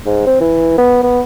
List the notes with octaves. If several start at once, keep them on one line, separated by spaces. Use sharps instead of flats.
G#2
C4
E3
B3
B3